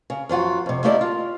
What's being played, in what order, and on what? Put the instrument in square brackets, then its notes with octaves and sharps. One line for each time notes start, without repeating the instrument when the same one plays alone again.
[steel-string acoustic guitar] C#3
F#2 F3 F4 F#4
F2 C3
A3 A#3 E4 G4 D5 D#5
F4